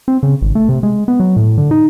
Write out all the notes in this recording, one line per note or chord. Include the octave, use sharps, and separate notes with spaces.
C4
C#3
G#1
A3
C3
G#3
B3
F#3
A2
D3
D#4